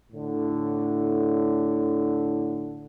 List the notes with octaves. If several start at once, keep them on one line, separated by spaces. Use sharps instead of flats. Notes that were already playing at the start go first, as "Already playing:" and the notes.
A2 D3